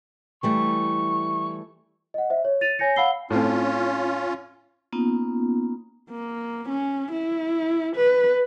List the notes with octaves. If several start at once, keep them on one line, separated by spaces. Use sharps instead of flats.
E3 G3 A3 C#6
D#5 F#5
C5 E5
C#5
A6 D#7 F7
C#5 G#5 G6 A#6 C#7
F5 F#5 B5 E6 C7 G7
A2 C4 C#4 F4
A#3 B3 C#4 D#4 F4
A#3
C#4
E4
B4